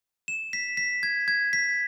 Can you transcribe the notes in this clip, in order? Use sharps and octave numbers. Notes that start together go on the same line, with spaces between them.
E7
B6
B6
G#6
G#6
B6